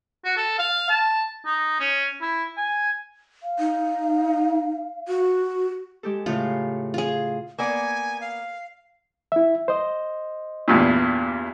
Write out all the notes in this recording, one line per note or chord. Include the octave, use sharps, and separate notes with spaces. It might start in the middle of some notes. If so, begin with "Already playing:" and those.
F#4
A4
F5
A5
D#4
C#4
E4
G#5
F5
D#4
F#4
G#3 G4 A4
A2 C#3 F4
F4 G#4
A#3 B3 D5 G#5
F5
E4 E5
C5 D#5
E2 G2 A#2